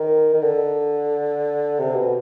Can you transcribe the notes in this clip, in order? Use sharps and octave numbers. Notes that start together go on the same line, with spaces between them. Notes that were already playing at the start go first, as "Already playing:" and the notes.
Already playing: D#3
D#3
D3
C3
B2